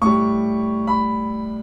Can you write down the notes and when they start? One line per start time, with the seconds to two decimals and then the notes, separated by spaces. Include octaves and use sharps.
0.02 A2 G3 C#6
0.87 B5